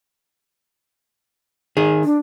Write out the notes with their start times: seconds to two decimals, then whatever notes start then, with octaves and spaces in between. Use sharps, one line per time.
1.77 D#3 G#4
2.04 D4